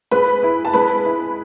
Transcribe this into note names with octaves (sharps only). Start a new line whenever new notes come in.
G#3 B4 B5
E4
A5
G#3 B4 B5
E4